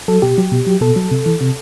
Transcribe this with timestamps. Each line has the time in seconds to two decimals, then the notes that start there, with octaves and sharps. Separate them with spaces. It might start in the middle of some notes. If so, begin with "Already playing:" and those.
0.08 F#3 A4
0.22 B2 G4
0.38 F#3
0.52 B2
0.67 F#3
0.81 B2 A4
0.96 F#3
1.11 C3
1.26 E3
1.41 C3